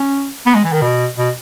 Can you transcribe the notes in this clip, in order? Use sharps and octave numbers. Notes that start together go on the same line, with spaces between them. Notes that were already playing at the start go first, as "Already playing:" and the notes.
Already playing: C#4
B3
G#3
E3
D#3
B2
B2